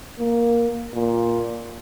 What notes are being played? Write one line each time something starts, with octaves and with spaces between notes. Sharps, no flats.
A#3
A#2